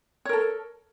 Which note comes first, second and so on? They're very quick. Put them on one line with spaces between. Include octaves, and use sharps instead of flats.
C#5 A#4 A4